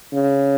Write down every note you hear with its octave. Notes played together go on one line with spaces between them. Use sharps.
C#3